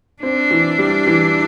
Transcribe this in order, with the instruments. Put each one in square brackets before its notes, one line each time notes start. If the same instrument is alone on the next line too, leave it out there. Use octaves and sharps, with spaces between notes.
[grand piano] C4 [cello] D4
[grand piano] E3
G3
E3